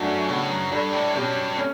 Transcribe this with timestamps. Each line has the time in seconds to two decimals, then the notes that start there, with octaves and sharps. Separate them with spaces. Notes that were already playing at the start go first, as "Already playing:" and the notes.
Already playing: F#2 A3 D4 F#4
0.28 A2 C#3 F#3 B3
0.50 F#2
0.72 G2 G3 D4 A4
0.93 A2
1.15 G2 B2 F#3 C#4 G4
1.57 A3 C#4